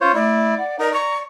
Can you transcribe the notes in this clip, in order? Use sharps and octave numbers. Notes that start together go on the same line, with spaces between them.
C#4 F4 C5 C#5
A3 E4 D5
F#5
D#4 A#4 D5
A#5 C#6